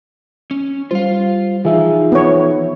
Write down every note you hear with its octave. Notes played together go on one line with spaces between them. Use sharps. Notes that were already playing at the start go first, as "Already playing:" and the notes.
C#4
G3 F4 C5 F5
E3 F3 D#4 F4 G#4 E5
B3 C#5